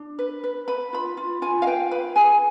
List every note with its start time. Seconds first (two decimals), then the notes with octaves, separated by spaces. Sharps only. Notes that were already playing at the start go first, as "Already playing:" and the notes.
Already playing: D4
0.19 B4
0.44 B4
0.68 B4 B5
0.93 F4 B5
1.17 F4
1.42 F4 G#5
1.62 F5
1.67 B4 G5
1.91 B4 B5
2.16 G#4 G#5